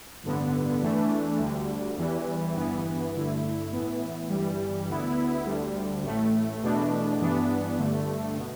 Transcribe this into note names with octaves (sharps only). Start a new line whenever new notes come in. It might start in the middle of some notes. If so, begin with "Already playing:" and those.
A1 G2 D3 B3
E2 E3 A3 D4
D2 D3 G3
E2 E3 G3
G1 G2 E3 B3
G2 D3 A3 E4
A2 E3 B3 E4
G1 G2 E3 G3
D2 D3 B3 E4
D2 D3 G3
A1 A2 A3
E2 B2 A3 D4
G2 E3 B3 D4
G1 G2 D3 A3
B2 B3